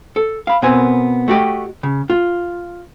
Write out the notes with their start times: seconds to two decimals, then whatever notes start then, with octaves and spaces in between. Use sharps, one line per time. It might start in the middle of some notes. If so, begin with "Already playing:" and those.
0.16 A4
0.47 F5 B5
0.62 B2 B3 C4 A#4 G#5
1.28 A3 F#4 G4 D#5
1.83 C#3
2.10 F4